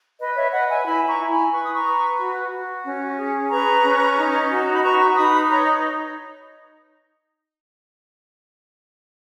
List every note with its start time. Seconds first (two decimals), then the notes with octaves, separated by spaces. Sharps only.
0.19 B4 D#5
0.36 C#5 E5
0.52 B4 D#5 F#5
0.69 E5 G#5
0.86 E4 G#5 B5
1.07 A#5 C#6
1.19 E4
1.30 G#5 B5
1.52 B4 C#6
1.63 D#6
1.75 A#5 C#6
1.85 B4
2.18 F#4
2.51 F#4
2.85 C#4
3.18 G#4
3.50 B4 A#5 C#6
3.84 C#4
4.17 D#4
4.50 F#4
4.65 A#5
4.73 B5
4.83 B4 A#5 C#6
5.16 D#4 B5 D#6
5.49 C#5 A#5 C#6